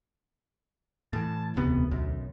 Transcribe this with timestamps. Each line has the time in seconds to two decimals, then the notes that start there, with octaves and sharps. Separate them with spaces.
1.13 A2 E3 A5
1.56 E1 D2 C3 B3
1.91 B1 F#2